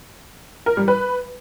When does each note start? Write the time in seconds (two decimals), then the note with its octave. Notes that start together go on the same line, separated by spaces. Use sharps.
0.66 A#4
0.77 G3
0.88 B4